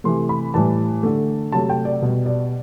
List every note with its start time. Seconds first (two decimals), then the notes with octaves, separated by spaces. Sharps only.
0.04 C3 E3 A3 C6
0.29 B5
0.54 A2 E3 G3 A5
1.03 D3 A3
1.52 C3 F#3 A3 A5
1.70 G5
1.85 D5
2.01 B2 G3
2.26 D5